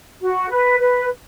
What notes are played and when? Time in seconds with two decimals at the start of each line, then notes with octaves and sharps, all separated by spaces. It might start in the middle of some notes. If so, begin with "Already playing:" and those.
0.22 F#4
0.50 B4
0.79 B4